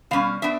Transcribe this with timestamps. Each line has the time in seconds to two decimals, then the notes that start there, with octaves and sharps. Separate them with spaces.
0.11 B2 G3 C#4 F5
0.42 B3 D4 E5